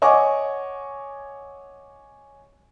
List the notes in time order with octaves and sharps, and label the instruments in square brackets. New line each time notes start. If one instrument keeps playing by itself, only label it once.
[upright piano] C#5 D#5 F#5 G#5 C#6 D6